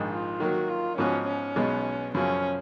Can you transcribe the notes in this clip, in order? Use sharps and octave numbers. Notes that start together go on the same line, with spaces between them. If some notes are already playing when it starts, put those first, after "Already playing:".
Already playing: A#1 G#2 D#3 G#3
F4
D#3 F#3 A#3 F#4
F4
G#2 F3 B3 C#4 F#4
C#4
B1 B2 G#3 B3
F#2 C#3 F3 C#4